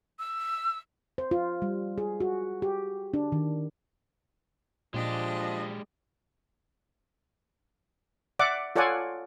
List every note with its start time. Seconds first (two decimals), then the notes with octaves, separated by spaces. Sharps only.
0.19 E6
1.18 C5
1.31 F4
1.62 G3
1.98 G#4
2.20 F#4
2.62 G4
3.14 D4
3.32 D#3
4.94 A#2 F3 G#3 D4 G4 D#5
8.39 D5 E5 F#5 D6
8.76 F4 A4 C#5 D5 F#5 G#5